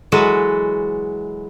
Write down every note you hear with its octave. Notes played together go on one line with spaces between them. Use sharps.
E3 F#3 G#3 F#4 A4 B4